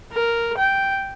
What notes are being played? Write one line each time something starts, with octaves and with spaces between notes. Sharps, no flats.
A#4
G5